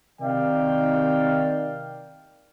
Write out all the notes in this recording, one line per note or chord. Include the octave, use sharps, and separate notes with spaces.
C3 D#3 D#4 D5 F5 G5